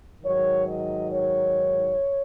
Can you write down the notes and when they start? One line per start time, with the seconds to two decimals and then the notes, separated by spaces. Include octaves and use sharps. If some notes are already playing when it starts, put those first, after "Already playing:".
0.22 G#2 D#3 F#3 C#5
0.66 D#5
1.10 C#5